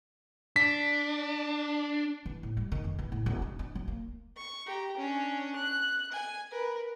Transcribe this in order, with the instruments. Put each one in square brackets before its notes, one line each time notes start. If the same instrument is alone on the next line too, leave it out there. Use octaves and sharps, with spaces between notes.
[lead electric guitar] D4 [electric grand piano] B6
[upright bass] E3
A2
G3
D#3
F2
E3
A2
E1
D4
D4
F#3
A#3
[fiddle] C#6
G4 A#5
C#4 D4
F#6
G#5
A#4 B4